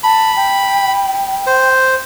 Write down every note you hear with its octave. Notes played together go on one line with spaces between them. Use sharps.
A5 B5
G5
C5